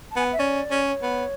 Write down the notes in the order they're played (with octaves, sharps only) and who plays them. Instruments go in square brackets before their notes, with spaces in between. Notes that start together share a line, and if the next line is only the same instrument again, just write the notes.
[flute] A5
[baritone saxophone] B3 [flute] G#5
[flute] F#5
E5
[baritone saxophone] C#4 [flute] D5
[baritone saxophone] C#4
[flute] C#5
[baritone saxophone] B3